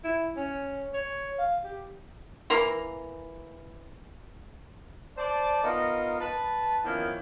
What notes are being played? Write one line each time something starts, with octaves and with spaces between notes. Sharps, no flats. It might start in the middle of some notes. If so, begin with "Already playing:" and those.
E4
C#4
C#5
F5
G4
E3 A#3 A#5
C5 D5 A5
B3 D#4 F4 A#4 D#5
B4 A5
D#3 F3 A#3 B3 C#4 E4